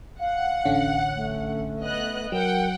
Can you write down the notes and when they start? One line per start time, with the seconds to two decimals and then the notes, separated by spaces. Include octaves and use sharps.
0.20 F5 F#5
0.65 A1 D3 C#4
1.15 A3
1.82 B3 D#5 F#6
2.32 F#3 A#4 F#5 G5